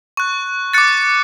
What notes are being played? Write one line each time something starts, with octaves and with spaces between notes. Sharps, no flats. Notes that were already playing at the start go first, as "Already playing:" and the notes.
C#6 F#6
D6 F#6 A6 C#7